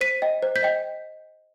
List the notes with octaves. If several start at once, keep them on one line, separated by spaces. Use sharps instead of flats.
C5 B6 D#7
D#5 G5
C5
G6 B6
D#5 G5